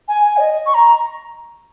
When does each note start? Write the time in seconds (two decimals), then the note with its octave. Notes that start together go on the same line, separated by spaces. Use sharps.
0.08 G#5
0.24 G#5
0.37 C#5
0.40 D#5
0.66 C#6
0.74 A#5